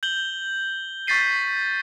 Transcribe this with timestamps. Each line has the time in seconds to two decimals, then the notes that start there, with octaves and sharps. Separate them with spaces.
0.03 G6 F#7 G7
1.07 C#6 G6 A6 B6 C7 D#7